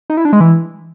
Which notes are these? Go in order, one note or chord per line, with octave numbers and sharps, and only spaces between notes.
D#4
E4
D4
G#3
E3